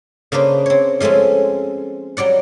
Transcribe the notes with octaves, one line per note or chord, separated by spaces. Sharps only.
C#3 A#3 D4 B4 C5
C4 C#5
F3 G#3 A3 C4 C#4
F#3 G3 D5 F#5